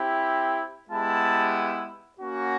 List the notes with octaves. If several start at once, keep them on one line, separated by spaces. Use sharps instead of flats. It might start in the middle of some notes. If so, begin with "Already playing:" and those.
Already playing: C4 E4 G4
G#3 B3 E4 G4 A5
A#3 C#4 F#4